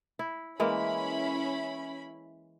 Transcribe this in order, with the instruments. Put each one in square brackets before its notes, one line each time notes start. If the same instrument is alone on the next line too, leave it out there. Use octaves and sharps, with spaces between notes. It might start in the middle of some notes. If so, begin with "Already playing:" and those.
[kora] E4
[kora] E3 G#3 A#3 [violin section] C#4 E4 B5